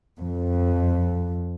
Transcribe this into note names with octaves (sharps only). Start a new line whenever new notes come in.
F2